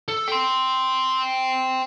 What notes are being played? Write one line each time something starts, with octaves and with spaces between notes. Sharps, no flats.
A4
G5 C6